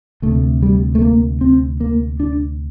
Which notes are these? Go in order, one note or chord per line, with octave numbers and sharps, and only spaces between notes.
D2 C3 A3
G3
A3
A#3
C4
A#3
D4